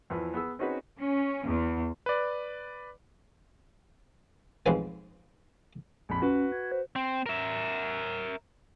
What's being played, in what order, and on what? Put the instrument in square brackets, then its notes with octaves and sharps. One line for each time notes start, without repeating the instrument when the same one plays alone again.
[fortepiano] E2 E3 F3
B3 G#4 E6
C4 C#4 D#4 F#4 G#4 B4
[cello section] C#4
E2
[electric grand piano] B4 D5
[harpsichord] B1 G#2 F3 C4 B4 G#5
[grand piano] A#1 F2 B5
[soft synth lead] C#4 [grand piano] F#4 B4
[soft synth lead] G#6
C5
[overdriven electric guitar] C4
A#4 E5